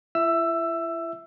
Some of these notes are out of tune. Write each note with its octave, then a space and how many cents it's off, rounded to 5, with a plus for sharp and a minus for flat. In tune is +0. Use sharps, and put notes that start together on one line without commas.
E4 +40 E5 +0 E6 +15